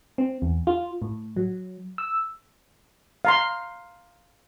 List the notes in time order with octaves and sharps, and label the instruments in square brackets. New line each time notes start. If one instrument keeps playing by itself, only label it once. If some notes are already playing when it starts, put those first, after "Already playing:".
[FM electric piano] C4
E2
F4
A2
F#3
E6
[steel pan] F5 A#5 C6